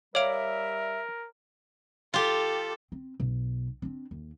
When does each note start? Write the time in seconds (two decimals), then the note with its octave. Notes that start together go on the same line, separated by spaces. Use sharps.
0.15 G3 A#4 C#5 D5 E5 F5 D7
2.14 F4 G4 A4
2.92 C4
3.20 B1
3.82 C4 D4
4.11 D#2